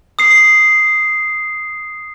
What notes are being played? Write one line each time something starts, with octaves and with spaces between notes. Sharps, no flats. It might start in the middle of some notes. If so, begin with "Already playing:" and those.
D#6 C7